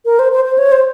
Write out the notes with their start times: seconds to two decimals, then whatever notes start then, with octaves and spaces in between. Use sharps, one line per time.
0.05 A#4
0.19 C5
0.32 C5
0.45 C5
0.58 C#5
0.72 C5